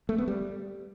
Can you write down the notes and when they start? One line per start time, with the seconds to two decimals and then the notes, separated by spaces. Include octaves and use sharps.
0.09 A3
0.18 B3
0.28 G3